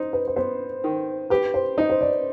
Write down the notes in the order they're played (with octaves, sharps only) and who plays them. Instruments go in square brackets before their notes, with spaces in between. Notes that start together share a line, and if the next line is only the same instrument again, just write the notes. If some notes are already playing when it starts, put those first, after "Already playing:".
Already playing: [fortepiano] D#4 [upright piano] C5
[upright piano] B4
B4
[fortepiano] B3 [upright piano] C5
[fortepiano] D#3
[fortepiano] G4 [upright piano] B4
[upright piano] C5
[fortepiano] D#4 [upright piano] D#5
[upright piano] C5
D5